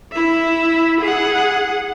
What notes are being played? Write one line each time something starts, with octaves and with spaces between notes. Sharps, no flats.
E4 E5
G#4 F#5